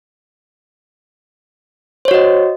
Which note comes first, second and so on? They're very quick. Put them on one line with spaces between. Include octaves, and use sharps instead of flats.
C5 C#5 F#4 D#5